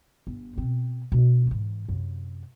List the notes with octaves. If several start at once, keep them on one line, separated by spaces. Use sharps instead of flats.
G1
B2 C4
B2 D4
G#2 E3
F#2 C3